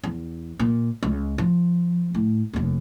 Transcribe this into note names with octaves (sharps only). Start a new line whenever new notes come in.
E2
A#2
C#2
F3
A2
F1 D#2